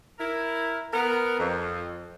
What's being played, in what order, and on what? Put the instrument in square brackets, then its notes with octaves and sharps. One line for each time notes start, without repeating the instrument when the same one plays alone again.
[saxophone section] E4 A#4
B3 A#4
F2